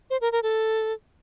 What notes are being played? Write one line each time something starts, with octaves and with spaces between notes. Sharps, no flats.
C5
A#4
A#4
A4